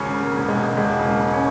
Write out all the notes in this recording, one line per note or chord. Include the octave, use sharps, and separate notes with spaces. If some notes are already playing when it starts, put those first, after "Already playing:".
Already playing: G#1 C#3 C#4
C#3
A#3
E1
G#3
E1
E1 G#3
C#3
A#3
C#3
C#4